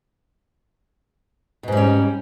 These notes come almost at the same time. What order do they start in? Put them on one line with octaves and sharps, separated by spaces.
B2 G#2 G3 C#4